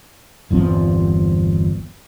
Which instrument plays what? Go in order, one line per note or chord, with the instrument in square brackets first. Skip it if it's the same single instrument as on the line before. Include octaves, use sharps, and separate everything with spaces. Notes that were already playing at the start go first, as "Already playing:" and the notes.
[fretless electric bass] G1 E2 F3 C4